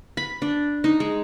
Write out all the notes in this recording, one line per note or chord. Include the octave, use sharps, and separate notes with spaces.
B5
D4
D#4
G#3